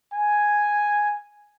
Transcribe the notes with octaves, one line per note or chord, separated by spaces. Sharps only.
G#5